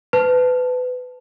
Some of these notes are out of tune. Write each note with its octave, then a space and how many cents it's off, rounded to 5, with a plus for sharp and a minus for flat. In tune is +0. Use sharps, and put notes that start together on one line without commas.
B4 +25 A5 +0